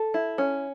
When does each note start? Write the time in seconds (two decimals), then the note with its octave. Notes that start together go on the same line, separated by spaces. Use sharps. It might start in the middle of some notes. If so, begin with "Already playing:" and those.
Already playing: A4
0.14 E4
0.38 C#4